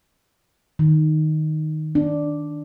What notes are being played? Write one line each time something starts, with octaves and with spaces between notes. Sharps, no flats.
D#3
D4